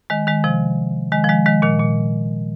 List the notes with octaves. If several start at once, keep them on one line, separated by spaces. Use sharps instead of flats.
D#3 G#3
D#3 G#3
C3 F3
D#3 G#3
F3
D#3 G#3
D#3 G#3
A#2 D#3
A#2